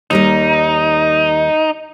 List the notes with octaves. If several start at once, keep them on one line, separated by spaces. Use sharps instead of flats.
D#2 G3 D#4 A#4